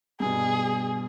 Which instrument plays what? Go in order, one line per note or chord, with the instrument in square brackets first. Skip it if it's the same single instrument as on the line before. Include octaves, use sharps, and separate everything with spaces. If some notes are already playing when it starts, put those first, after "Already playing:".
[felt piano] G2 B2 [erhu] G#4